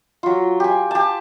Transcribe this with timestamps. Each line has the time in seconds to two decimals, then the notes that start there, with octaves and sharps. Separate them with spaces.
0.23 F#3 F4
0.60 G4 G#5
0.91 G4 A5